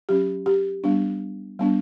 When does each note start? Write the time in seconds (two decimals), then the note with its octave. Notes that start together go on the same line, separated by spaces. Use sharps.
0.09 F#3 C#4 G4
0.46 G4
0.84 G3 B3 D4
1.59 G3 B3 D4